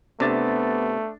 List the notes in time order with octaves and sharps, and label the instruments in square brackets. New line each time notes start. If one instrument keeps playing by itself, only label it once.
[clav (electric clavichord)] C3 [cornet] A3 [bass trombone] B3 [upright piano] D4 A6